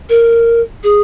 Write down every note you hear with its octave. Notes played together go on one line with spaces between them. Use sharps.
A#4
G#4